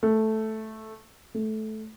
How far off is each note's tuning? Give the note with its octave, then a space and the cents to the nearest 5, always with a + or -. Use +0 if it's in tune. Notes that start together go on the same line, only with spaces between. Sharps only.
A3 -5
A3 -15